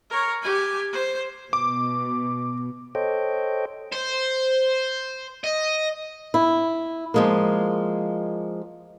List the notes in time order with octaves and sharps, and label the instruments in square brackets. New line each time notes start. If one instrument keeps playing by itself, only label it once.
[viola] A#4 C#5
G4 G#5
C5
[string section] B2 [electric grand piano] D6
[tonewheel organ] A4 C5 C#5 D#5 G5
[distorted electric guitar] C5
D#5
[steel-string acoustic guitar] E4
F3 G#3 A#3